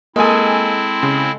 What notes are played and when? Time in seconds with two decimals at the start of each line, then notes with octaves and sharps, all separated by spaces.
0.16 G#3 A#3 C4 E4 A4 G#5
1.03 C#3 C6